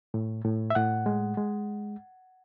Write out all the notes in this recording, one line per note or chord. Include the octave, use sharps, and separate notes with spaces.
A2
A2
E5
A2 F#5
G#3
G#3